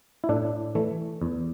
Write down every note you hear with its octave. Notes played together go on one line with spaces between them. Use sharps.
E4
A2 D4
E3 A3
E2